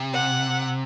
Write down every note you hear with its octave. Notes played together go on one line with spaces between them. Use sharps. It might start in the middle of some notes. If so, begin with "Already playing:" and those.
Already playing: C3
F#5